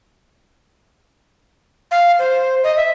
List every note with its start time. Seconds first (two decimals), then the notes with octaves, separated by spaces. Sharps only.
1.91 F5
2.19 C5
2.64 D#5
2.77 E5